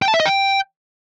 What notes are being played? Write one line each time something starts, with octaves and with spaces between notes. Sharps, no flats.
G5
A5
E5
D#5
G5